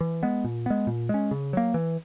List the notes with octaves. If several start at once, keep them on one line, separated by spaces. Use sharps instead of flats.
E3
G#3 B3
A#2
G#3 B3
A#2
G#3 C#4
C#3
F#3 A#3
E3